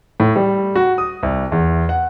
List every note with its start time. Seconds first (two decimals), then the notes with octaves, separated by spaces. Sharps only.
0.20 A2
0.36 G3
0.76 F#4
0.98 D#6
1.23 C2
1.52 E2
1.89 F#5